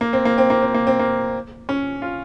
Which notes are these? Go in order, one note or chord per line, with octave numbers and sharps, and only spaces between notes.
A#3
C4
A#3
C4
A#3
C4
A#3
C4
A#3
C#4
F4